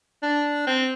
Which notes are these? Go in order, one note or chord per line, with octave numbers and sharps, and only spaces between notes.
D4
C4